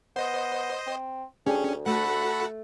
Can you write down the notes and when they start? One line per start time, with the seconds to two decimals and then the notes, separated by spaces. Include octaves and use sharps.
0.16 B3 C5 D#5
0.86 C4
1.46 D2 C#4 D4 G4 G#4
1.86 A3 F#4 A4 F#5 B5